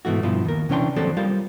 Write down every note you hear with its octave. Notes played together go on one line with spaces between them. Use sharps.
G#2 B2 E3 A3 F#4
G2 B2 F3 E4 F4
D#2 A#4
C3 E3 C#4 D4 G5 C6
D#2 F3 F#3 C4 A4 D5
G3 F4 A#4 C5 F5